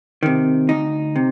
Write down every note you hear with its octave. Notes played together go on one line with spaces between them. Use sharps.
C3 D#3
D2 D#4
C3